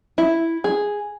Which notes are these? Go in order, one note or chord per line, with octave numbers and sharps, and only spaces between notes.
E4
G#4